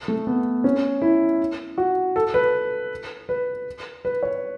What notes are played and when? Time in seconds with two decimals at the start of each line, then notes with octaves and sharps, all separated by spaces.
0.08 A3
0.27 B3
0.64 C#4
1.02 E4
1.78 F#4
2.16 A4
2.34 B4
3.29 B4
4.05 B4
4.23 C#5